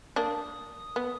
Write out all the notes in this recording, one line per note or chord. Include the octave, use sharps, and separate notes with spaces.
A#3 D4 D#6
B3